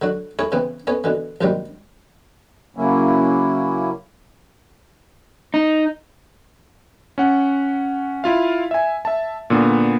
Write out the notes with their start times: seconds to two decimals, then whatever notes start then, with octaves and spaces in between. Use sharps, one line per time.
0.02 D3 F#3 F#4
0.39 E4 G#4 A4 C#5
0.52 C#3 E3 B3 C4
0.87 B3 C#4 A4 C#5
1.04 B2 D3 E3
1.41 A#1 G#2 C3 D#3 F#3 G3
2.77 C#3 F#3 A#3 C#4 E4
5.54 D#4
7.18 C#4 F#5
8.24 E4 F4 F5
8.71 E5 G#5
9.05 E5 A5
9.50 A#2 D3 B3